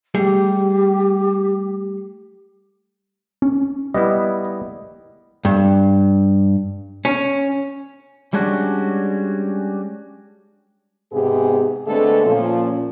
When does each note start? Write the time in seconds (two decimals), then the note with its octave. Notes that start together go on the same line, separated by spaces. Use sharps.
0.15 G3 A3 G4 G#4
3.42 C#4
3.94 G3 B3 E4 D#5
5.45 G2
7.05 C#4
8.33 G3 G#3 C#4 D4 F#4
11.11 G#2 C3 B3 G4 G#4
11.87 D3 G#3 A3 B3 C4 A4
12.26 A#2 F3 C#4